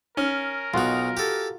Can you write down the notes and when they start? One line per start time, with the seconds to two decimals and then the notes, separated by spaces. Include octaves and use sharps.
0.17 C#4 A#4
0.74 B1 D#4 F4 F#4
1.17 G4 A4